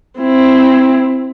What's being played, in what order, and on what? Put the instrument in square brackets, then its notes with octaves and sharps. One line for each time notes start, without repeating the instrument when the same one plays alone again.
[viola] C4 E4